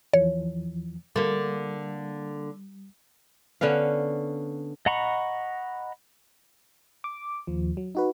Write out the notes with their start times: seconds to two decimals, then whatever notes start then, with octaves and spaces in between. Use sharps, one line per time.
0.14 E2 E3 F3 C#5
1.16 D3 G3 A#3
3.61 D3 B3 C#4 F5
4.86 D#5 F#5 A#5 B5 C#6
7.04 D6
7.47 D#2 F3
7.77 F#3
7.95 D#4 F#4 B4